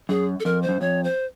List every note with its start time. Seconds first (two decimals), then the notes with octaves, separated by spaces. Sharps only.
0.09 F#2 G#4
0.40 A4
0.45 F2 A#4
0.62 C5
0.69 F#2
0.81 F2 C#5
1.04 C5